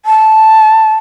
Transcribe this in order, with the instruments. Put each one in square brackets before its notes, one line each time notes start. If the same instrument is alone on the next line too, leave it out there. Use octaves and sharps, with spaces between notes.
[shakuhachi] A5